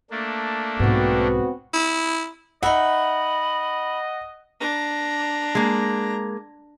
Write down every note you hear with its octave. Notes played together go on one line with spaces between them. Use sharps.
A3 A#3 D4
B1 G#2 B3 C4 F#4
E4
D#4 D#5 E5 F#5 B5
D4 A#5
G#3 A#3